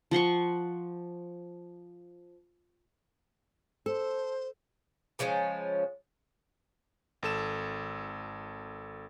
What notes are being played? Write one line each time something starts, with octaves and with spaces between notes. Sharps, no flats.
F3 F#5 C6 C#6
A4 C5
C#3 F3 G#3 C#4
G#1 A4 E7